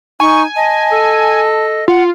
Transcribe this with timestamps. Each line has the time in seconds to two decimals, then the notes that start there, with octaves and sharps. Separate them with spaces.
0.20 D#4 G#5 C#6
0.56 D#5 A5
0.92 A4
1.88 F4 F#5